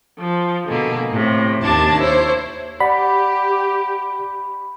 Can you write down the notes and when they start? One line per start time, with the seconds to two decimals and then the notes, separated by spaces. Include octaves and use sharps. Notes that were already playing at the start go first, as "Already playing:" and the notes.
0.18 F3
0.67 B2 D3 G#3 A#3
1.10 A2 C3
1.63 D#2 D4 A5 G#6
2.00 E4 C5 C#5
2.80 G4 D5 F#5 B5